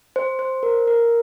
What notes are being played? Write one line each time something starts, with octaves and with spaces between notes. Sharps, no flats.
C5
C5
A#4
A#4